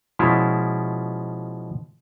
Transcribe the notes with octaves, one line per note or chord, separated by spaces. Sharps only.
B2 F3 G#3 C#4 E4 F4